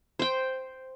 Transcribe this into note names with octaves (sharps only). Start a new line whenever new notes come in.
C5 G5